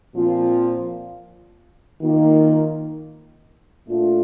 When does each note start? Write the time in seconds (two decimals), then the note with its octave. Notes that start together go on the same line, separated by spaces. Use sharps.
0.15 A#2 F3 C4 F4
2.01 D#3 A#3 F4
3.87 A#2 A3 D4 F4